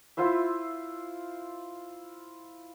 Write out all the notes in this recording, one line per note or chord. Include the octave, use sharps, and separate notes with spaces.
E4 F4 C5 E5